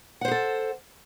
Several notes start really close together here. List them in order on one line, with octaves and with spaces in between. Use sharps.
F#5 C5 G#4 A4